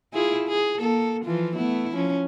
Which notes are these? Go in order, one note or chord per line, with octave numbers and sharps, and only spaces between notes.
E4 F4 G#4
G#4
A#3 A4
E3 F3 F4
A3 B3 E4
F3 C#4